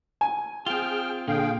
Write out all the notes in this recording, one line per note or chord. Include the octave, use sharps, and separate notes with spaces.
G#5
C4 F4 G#4 G5 F6
A#2 D3 G#4 F5 G5